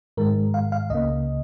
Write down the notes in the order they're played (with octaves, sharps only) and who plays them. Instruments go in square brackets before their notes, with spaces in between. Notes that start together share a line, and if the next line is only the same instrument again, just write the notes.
[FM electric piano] G#2 D#3 G#3 A#4
F5
F5
C#2 C#3 A#3 D#5